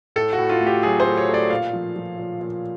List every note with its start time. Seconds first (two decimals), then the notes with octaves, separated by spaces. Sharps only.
0.16 A2 A4
0.33 F#4
0.38 A2
0.50 F4
0.60 A3
0.66 G4
0.83 F#3 G#4
1.00 C5
1.06 A3
1.18 C#5
1.28 A3
1.34 D5
1.50 A#2 F5
1.73 F3
1.96 F3
2.19 A#2
2.41 A#2